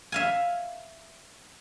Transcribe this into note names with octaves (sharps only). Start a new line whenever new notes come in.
E5 F5 G#5